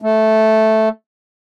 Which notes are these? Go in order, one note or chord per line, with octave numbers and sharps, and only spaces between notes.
A3